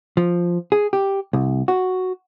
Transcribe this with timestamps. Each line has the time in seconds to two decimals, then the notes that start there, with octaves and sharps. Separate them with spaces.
0.17 F3
0.72 G#4
0.93 G4
1.33 C2
1.68 F#4